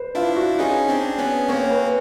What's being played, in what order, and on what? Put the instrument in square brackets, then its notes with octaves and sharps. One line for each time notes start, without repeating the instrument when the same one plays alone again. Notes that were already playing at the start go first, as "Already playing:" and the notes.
Already playing: [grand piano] B4 C5
[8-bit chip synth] D4 E4 [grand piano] F4
[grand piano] F#4
[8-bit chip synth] C#4 D#4 [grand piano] G#4
[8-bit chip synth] C4 D4
B3 C#4
[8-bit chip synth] A#3 C4 [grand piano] C#5
[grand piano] B4